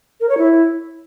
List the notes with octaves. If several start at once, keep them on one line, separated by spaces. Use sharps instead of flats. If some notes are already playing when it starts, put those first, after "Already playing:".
A#4
C#5
E4